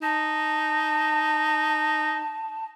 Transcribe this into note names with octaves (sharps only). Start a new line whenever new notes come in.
D#4 A5